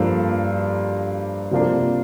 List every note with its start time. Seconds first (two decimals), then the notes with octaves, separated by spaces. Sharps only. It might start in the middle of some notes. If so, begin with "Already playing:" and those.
Already playing: G2 F3 A#3 D4 A4
1.51 C3 F3 A#3 D4